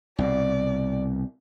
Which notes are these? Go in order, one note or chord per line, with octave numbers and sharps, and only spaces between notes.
C2 B2 D5